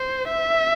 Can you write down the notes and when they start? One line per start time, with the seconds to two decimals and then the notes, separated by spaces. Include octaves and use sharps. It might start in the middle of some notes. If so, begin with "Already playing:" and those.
Already playing: C5
0.29 E5